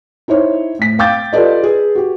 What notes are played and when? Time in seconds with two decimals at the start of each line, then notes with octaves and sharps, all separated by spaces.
0.28 D#4 E4 C5 C#5
0.79 A2 B6
0.99 F5 G5 D6 G6 A6
1.33 F4 G4 A4 B4 D5 D#5
1.64 G#4 B4
1.95 F#4 G4